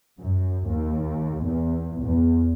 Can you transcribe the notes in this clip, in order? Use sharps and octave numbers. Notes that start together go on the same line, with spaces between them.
F#2
D#2
E2
E2